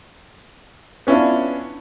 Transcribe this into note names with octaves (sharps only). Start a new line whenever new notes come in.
B3 C#4 D4 E4 F4